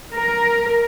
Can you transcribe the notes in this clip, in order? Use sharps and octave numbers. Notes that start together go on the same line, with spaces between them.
A#4